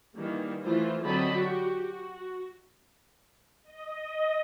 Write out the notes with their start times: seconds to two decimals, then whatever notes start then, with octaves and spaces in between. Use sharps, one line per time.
0.16 D#3 E3 G3 A#3
0.64 E3 F3 A3 E4 F4 C5
1.03 D3 F#3 C4 D#5 A5 B5
1.35 F#4 G4
1.83 F#4
3.63 D#5